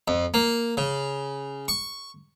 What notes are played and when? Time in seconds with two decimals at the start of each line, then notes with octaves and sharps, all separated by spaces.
0.08 F2
0.34 A#3
0.77 C#3
1.68 C#6